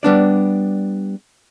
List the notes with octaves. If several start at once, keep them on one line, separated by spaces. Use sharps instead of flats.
G3 B3 D4 D5